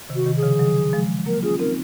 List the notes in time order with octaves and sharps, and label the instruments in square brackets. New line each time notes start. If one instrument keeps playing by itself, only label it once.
[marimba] C3 D#3
[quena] F#4
[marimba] C3 D#3
[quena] G#4
[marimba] C#3 F3
D#3 F#3
F3 G#3
[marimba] F#3 A#3 [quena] A#4
[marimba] C#4 F4 [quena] G#4
[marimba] C4 D#4 [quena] A#4